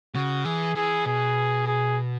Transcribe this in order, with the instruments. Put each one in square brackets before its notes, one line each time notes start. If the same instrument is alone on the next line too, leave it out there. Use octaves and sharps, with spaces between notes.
[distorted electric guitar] C#3 [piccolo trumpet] F#4
[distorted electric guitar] E3 [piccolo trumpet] G#4
[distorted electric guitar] E3 [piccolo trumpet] G#4
[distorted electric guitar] B2 [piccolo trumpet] G#4
[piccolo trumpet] G#4